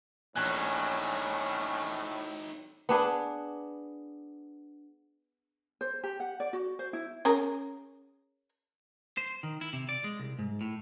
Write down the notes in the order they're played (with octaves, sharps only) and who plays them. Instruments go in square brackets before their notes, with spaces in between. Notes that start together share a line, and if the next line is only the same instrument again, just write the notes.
[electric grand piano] A#1 G#5 F#6 [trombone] A2 [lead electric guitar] C4 D#4 [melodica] C#4
[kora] B3 D4 G#4
[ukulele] C5
G4
F#5
D5
F#4
C5
E4
[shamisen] C#4 G#4 A#4
[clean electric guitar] C5
D#3
E4
C3
D5
G#3
C2
G#2
A2